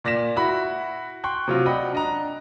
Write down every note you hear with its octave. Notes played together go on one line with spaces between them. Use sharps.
A#2 D5 A#6 B6 E7
E4 F#4 B5
G5 C6 C#6 F#6
C3 F#3 F4 F#4
D5 D#5 F#5 G5 B5
D4 D#5 A#5